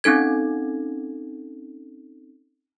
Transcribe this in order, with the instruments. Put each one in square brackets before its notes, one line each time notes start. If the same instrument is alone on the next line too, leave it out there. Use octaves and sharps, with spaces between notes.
[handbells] C4 C#4 D#4 A4 G#6